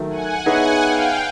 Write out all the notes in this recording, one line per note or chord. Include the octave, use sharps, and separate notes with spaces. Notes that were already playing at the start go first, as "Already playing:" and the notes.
Already playing: D#3 F#3 A3
F#5 G#5
B3 D#4 G#4 C#5 E5 F#5 G#5
F5 G5